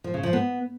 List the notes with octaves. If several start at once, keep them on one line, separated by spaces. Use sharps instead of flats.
F3
C#3
F3
B3